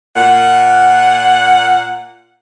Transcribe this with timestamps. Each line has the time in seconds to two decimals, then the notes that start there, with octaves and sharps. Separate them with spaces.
0.16 A#2 F#5